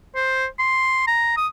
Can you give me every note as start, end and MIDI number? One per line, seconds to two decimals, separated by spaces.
0.15 0.46 72
0.59 1.06 84
1.07 1.37 82
1.37 1.47 87